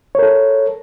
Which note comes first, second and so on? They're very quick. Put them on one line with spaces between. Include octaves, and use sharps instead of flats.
C#5 A#4 A4